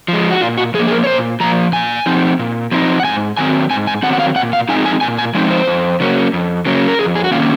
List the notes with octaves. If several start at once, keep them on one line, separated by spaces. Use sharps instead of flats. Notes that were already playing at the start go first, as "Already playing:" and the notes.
F3 G#3
F#4
A#2 F4
F#4
F3 A#3 G#4
G#4
A#4
C#5
A#2 C5
F3 A#3 A#5
A#2 G#5
F3 C4 D#4
A#2
F3 C4 D#4
F#5
G#2 G#5
D#3 F#3 C4 G#5
G#2 G#5
G#5
D#3 F#3 C4 F#5
F#5
F5
A#2 F#5
F5
F3 G#3 C4 D#4 G#5
G#5
A#2 G#5
G#5
F3 G#3 C4 D#4
C5
F2
C#3 F#3 A#3 C#4
F2
C#3 F#3 A#3 C#4
A#4
F2 G#4
G#4
F#4
C3 D#3 A#3 C#4 F4